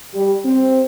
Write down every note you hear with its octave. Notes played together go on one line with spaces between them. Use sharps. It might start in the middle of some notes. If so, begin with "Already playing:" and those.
G3
C4